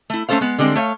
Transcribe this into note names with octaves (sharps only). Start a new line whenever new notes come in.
A3 E4
A3 C#4 A4 C5 F5
G#3 B3
D3 G3 G#3 C4 D4
A3 C#5 F5